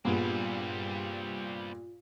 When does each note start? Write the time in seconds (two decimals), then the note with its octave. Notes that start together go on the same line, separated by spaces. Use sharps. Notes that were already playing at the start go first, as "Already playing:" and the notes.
0.05 G2 A#2 G3 B3 C4 F4 G#4